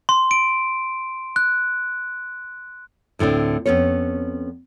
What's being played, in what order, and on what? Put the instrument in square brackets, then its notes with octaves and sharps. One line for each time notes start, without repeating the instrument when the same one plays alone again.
[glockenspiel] C6
D7
F#6
[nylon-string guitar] D2 A2 D3 C4 D4
F2 C3 B3 C#4 C#5